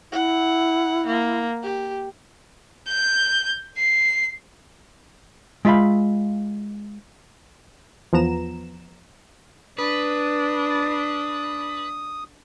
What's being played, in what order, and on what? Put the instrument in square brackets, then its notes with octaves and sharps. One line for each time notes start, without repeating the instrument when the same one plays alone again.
[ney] E4 [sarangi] F#5
[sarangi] A#3
G4
[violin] G6
C7
[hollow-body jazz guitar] G#3 F4 E5 F5 B5
[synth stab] E2 F3 B3 A#5 E7
[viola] D4 [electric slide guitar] B4 [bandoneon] D#6